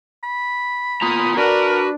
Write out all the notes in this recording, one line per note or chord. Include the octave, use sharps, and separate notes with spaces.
B5
B3 F4 A#5 D#6
D4 F#4 A#4 B4